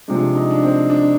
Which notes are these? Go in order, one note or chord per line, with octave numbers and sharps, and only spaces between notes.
C3 F3 G#3 D4
D#4
D4
C4
D4